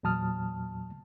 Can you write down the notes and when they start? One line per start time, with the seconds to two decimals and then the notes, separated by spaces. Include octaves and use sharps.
0.03 E2 A#2 F#3 A5 D#6 F6